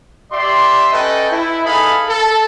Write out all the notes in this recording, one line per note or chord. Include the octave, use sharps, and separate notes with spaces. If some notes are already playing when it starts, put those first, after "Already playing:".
G4 D5 E5 C6
C#4 A4 B4 D#5 G5
E4
D#4 G#4 A4 B4 F5 B5
A4